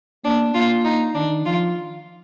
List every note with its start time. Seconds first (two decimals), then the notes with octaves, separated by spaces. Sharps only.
0.25 A#3 D4
0.54 A#3 F4
0.84 D#4
1.15 D#3 D4
1.45 F3 F4